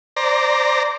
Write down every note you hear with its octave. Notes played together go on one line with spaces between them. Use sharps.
C5 D5 A#5